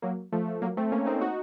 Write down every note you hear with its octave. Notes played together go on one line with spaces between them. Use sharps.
F#3 A#3
F3 A3
F3 A3
F#3 A#3
A3 C4
A#3 C#4
C4 D#4
D#4 F#4